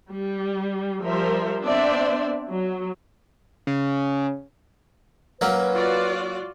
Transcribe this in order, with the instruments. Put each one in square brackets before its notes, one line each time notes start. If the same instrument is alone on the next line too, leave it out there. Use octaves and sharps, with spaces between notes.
[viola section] G3
F3 G3 A#4 C5 E5
B3 C4 D4 C5 D5 E5
F#3
[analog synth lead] C#3
[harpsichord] F#3 A#3 C#4 [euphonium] B4
[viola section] F4 F#4 D5